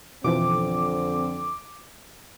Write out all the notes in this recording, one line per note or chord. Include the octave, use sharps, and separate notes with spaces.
F2 B2 D3 E3 F3 C4 D6